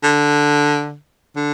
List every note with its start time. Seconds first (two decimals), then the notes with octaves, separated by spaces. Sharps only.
0.03 D3
1.36 D3